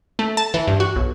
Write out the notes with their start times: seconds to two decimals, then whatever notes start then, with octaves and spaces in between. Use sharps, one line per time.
0.19 A3
0.37 A5
0.54 E3
0.68 G2
0.80 F#4
0.96 B1